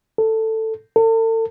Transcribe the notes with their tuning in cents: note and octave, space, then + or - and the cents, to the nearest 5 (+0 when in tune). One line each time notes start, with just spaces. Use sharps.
A4 +10
A4 +40